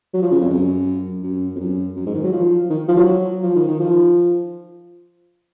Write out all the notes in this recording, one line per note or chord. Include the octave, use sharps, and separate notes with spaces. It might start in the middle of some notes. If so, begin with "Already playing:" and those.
F#3
F3
C#3
F2
F#2
F#2
F2
F#2
F#2
G#2
D#3
F#3
F3
D#3
F3
F#3
F3
D#3
D#3
F3